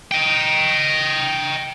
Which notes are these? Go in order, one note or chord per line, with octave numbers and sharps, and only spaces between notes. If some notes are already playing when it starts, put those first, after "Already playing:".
D#5 G5